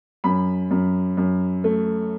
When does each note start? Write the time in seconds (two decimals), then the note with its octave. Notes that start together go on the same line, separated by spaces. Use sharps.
0.24 F#2 B5
0.71 F#2
1.17 F#2
1.64 A3